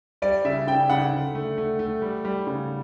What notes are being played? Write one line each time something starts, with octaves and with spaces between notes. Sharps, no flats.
G3 D5
C#3 E5
C#3 G5
C#3 F#5
D3
A3
A3
A3
G3
G3
C#3